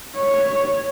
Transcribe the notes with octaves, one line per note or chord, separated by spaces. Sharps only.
C#5